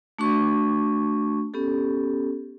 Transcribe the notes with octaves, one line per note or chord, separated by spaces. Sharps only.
A3 D4 F#4 C#6
B3 C#4 G4 A4